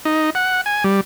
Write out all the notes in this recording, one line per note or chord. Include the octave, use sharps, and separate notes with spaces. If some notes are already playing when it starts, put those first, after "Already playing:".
D#4
F#5
G#5
G3